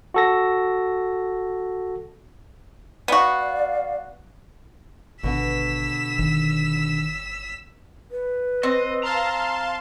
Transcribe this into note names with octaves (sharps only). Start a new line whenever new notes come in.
F#4 A4 A#6
B3 F#4 D5 F5
G#1 B2 D3 E6 B6
G1 D#3
B4
C4 D#5
F5 A5 A#5 C6